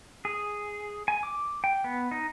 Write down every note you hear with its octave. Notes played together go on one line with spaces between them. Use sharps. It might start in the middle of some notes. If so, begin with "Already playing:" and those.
G#4
G#5
D6
G5
B3
D#4